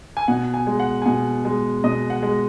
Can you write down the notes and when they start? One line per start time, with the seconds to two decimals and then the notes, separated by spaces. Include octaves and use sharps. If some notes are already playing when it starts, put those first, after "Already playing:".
0.17 G#5
0.28 B2 F#5
0.54 G#5
0.67 G#3
0.79 F#5
1.02 G#5
1.06 B2 F#5
1.45 G#3
1.84 B2 D#5
2.10 F#5
2.23 G#3